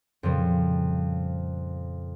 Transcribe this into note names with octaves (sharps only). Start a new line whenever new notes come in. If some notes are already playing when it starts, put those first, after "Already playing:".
F2 A#2 C#3 F3 G3